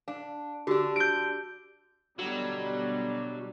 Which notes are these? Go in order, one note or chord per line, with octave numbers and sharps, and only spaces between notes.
D4 F5
D3 D4 F#4 G4
G6 D7
B2 D3 F#3 G3